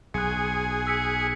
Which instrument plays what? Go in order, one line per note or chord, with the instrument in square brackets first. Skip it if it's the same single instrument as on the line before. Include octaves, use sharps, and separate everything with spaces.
[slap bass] B1 [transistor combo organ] G#4 [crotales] F#6 C#7
[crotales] E6 B6 C#7